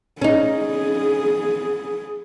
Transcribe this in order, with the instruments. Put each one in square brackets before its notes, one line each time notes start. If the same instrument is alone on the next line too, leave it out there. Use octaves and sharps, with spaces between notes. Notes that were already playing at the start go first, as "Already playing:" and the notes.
[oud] C#4 D#4 [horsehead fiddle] G#4